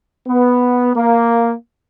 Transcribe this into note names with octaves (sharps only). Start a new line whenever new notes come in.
B3
A#3